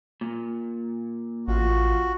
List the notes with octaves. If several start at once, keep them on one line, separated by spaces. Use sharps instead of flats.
A#2
A1 F4 F#4